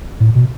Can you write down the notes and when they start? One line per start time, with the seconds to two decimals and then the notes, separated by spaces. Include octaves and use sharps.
0.20 A2
0.35 B2